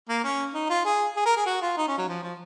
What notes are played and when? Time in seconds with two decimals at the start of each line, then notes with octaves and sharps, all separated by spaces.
0.09 A#3
0.24 C#4
0.54 D#4
0.70 F4
0.85 G#4
1.16 G#4
1.26 A#4
1.36 G#4
1.46 F#4
1.62 F4
1.77 D#4
1.88 C#4
1.98 F#3
2.08 F3
2.23 F3